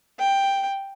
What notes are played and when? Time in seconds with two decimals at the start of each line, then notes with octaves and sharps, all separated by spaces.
0.19 G5